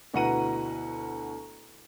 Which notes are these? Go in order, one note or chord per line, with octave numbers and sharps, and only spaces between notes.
D2 B2 E4 F#5 A#5 D#7